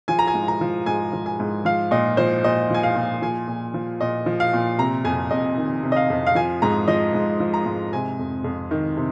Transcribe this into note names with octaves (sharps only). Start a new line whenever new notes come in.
F3 G#5
A#5
G#5
G#2
A#5
F3
G#2 G#5
F3
G#5
G#2
F3 F5
A#2 D#5
F3 C5
A#2 D#5
F3 G#5
F5
A#2
F3 G#5
A#2
F3
A#2 D#5
F3
F5
A#2
C3 A#5
F2 G#5
F2 D#5
D#3
C3
D#5
F5
F2
F5
F3 G#5
G#2 A#5
F3 D#5
G#2
F3
A#5
G#2
C3 G#5
F2
F2
D#3
C3